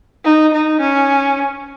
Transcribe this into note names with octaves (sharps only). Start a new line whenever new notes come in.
D#4
D#4
C#4